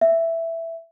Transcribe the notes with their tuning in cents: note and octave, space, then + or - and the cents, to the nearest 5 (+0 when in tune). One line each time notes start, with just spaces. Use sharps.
E5 +5